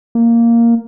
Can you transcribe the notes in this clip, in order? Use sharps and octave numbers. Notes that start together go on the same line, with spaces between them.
A#3